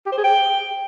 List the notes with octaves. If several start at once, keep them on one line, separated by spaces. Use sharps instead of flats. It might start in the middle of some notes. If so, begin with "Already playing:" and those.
G4
C5
G#4
G5